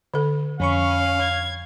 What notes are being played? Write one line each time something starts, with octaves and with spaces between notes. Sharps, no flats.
D3 A4
F2 C#4 F5 B5 C#6
G#6